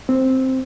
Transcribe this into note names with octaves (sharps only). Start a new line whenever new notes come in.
C4